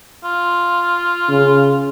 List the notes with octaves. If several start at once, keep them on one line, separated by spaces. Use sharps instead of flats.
F4
C#3